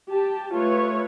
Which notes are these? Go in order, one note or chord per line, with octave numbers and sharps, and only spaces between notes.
G4 A5
A3 F4 B4 C#5